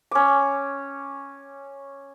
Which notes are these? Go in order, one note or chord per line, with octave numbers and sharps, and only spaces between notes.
C#4 D6